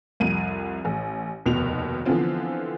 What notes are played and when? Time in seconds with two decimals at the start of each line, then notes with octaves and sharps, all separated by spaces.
0.20 C2 F2 D#7
0.85 A1
1.45 F1 D#2 B2 B3 F7
2.05 D3 E3 F3 B3 C4 F4